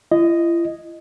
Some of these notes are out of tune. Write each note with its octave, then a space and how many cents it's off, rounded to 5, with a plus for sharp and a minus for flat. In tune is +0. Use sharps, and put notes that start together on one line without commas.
E4 +45 D#5 +0